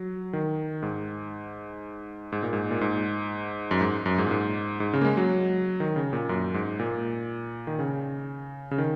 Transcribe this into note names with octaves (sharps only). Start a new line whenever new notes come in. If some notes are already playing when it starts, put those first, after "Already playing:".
Already playing: F#3
D#3
G#2
G#2
A#2
G#2
A#2
G#2
F#2
G#2
F#2
G#2
A#2
G#2
G#2
C#3
A#3
G#3
F#3
D#3
C#3
A#2
F#2
G#2
A#2
D#3
C#3
C#3
D#3